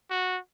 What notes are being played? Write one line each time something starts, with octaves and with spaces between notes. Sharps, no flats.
F#4